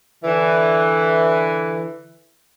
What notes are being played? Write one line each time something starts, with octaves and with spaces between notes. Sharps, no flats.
D3 E3